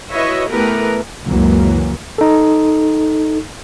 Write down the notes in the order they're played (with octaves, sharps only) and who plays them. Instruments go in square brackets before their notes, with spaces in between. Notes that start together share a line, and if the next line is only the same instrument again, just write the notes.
[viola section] E4 F#4 B4 C#5 D#5 E5
E3 A3 B3 G4 A#4 B4
[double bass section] C#2 F#2 E3 F#3 A#3
[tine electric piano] D#4 A4